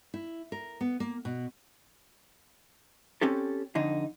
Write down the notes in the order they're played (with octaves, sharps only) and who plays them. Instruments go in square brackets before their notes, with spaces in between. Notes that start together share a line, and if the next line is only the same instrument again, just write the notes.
[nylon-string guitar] E4
A#4
B3
A#3
B2
[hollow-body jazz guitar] C4 C#4 G4 A4
F2 D3 D#4